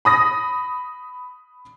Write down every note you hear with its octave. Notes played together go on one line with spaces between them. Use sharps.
B5 D#6 A#6